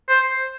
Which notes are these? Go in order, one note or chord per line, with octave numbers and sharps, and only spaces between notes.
C5